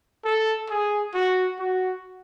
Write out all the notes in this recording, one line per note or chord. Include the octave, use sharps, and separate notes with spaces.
A4
G#4
F#4
F#4